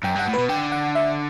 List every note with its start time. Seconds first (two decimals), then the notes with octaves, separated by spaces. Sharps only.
0.03 F#2 G5
0.15 G2 F#5
0.27 A2
0.34 B2 B4
0.49 D3 G5
0.72 F#5
0.95 E5